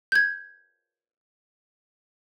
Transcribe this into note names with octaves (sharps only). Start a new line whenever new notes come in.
G6 G#6